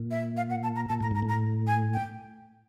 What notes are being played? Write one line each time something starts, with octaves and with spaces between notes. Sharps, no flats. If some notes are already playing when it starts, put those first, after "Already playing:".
Already playing: A#2
E5
F5
F#5
A5
A#5
A#2 A5
A2 A#5
G#2 A#5
A2
A#5
G#5
G5